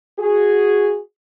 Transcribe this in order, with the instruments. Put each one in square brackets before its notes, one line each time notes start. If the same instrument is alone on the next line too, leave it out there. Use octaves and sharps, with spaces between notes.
[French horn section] F#4 G#4